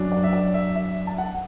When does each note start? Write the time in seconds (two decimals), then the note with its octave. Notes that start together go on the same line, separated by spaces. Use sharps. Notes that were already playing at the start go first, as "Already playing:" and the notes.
Already playing: F#2 F#3 D4
0.12 D5
0.24 E5
0.33 D5
0.54 E5
0.76 E5
1.07 A5
1.18 F#5